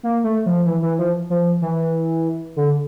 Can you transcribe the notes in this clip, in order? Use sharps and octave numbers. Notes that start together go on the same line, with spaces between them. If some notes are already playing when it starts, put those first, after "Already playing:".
A#3
A3
F3
E3
E3
F3
F3
E3
D3